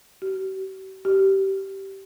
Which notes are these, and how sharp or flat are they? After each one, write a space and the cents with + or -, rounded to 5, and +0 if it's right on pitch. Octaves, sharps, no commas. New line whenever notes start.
G4 -45
G4 -20